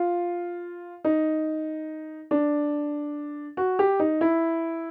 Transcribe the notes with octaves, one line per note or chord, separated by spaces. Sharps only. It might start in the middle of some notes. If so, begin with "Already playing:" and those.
Already playing: F4
D#4
D4
F#4
G4
D#4
E4